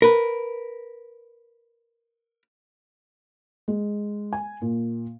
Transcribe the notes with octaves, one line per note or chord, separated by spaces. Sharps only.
A#4 B4
G#3
G#5
A#2